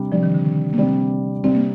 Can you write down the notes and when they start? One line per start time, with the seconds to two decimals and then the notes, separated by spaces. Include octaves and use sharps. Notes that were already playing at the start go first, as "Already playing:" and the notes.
Already playing: C3 G3 D4
0.12 C3 F3 G3 D4
0.23 D#3
0.34 D3
0.45 D#3
0.73 A#3
0.78 C3 G3 C4 D4
1.44 C3 G3 C4 D4
1.55 A#3